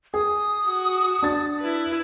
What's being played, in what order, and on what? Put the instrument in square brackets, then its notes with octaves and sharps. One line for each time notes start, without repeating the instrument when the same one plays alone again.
[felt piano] G#4 [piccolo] D#6
[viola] F#4
[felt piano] D4 A6
[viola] E4 B4